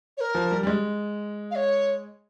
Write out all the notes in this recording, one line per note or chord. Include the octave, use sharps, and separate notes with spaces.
C#5
A#4
F3
G3
G3
G#3
F5
C#5